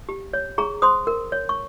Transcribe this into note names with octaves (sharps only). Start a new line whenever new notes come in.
G4
C#5
G#4 A#5 C#6
C5 C6 D#6
A#4
C#5
C#6